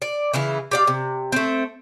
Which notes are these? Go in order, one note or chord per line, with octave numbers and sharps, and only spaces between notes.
D5
C#3 E3 E4 F4
G4 D5 F5
C3
A3 C4